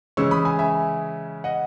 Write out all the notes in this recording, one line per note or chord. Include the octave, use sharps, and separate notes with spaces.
C#3 E3 G#3 C#4 C#6 E6
B5 D#6
G#5 B5
E5 G#5
D#5 F#5